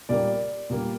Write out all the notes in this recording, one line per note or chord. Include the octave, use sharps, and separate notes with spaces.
A#2 G3 A#3 D5
A#2 G3 A#3